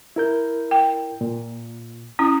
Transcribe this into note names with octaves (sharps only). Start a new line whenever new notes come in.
E4 A#4 G6
G5
A#2
C#4 E4 D#6